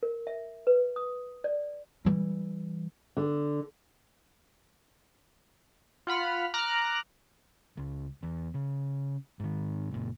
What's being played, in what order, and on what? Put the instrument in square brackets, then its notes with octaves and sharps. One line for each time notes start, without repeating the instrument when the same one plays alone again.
[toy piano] A#4
E5
B4
D#6
D5
[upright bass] E3 G3
[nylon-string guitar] D3
[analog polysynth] F4 F#5 B5 F6
A#5 D6 F6 F#6
[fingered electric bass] C#2
E2
C#3
G#2 D#3
F#1 A#2